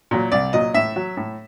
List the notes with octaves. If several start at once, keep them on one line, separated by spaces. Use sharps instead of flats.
A#2 F#3
C2 D5
A#2 F#3 D#5
A2 E5
F#3
A2